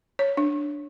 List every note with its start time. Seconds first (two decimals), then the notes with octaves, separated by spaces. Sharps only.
0.19 C#5
0.37 D4